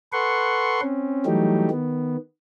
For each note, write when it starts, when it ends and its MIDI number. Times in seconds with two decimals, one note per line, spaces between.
0.13 0.81 69
0.13 0.81 71
0.13 0.81 78
0.13 0.81 84
0.13 0.81 85
0.81 1.26 60
0.81 1.26 61
1.26 1.69 52
1.26 1.69 54
1.26 1.69 55
1.26 1.69 57
1.26 1.69 63
1.26 1.69 67
1.70 2.17 51
1.70 2.17 59